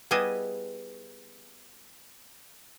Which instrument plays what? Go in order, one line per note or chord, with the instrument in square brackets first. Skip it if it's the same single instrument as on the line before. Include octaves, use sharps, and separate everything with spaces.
[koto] G3 B3 E4 G#4 D#5